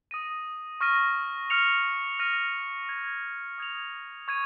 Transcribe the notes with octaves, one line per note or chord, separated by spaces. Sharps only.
D#6 A#6 D#7
C#6 F6 A#6 D#7
F6 C#7 F7
F6 A#6 D#7
G#6 F7
D#6 G#6 F7
C#6 G#6 D#7